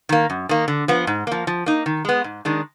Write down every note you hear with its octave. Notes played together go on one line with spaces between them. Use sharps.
D#3 A#3
F#2
D#3 A#3
D3
F3 B3
G#2
F3 A#3
F3
A#3 D#4
D#3
G#3 B3
G#2
D#3 G#3 D4